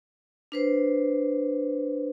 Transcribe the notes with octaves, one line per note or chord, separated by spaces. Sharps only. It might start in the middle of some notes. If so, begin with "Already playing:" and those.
D4 B4 C5